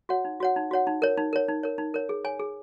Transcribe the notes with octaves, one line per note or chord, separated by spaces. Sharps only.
F#4 C#5 F#5
D#4
F#4 C#5 F#5
D#4
F#4 C#5 F#5
D#4
A#4 C#5
D#4
A#4 C#5
D#4
A#4 C#5
D#4
A#4 C#5
G#4
C#5 G#5
G#4